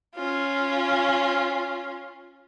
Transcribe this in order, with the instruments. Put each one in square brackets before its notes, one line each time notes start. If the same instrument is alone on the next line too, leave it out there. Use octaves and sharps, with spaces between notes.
[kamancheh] C#4 F4